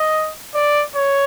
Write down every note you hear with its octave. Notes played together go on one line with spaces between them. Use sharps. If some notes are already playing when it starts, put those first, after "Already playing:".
Already playing: D#5
D5
C#5